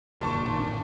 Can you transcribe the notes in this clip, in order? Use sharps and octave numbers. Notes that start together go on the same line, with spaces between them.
E1 F#2 A#2 D3 A5 C#6
G#1 D#3
A2 C4 D4